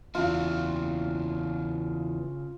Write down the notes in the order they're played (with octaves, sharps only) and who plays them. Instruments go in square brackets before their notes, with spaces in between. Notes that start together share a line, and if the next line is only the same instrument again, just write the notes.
[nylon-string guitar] E2 E3 F5 [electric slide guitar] C#3 D4 F#4 [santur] F4